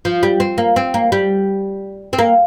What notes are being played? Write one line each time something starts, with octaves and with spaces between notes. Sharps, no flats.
F3
G3
C4
A#3
C4
A#3
G3
C4
A#3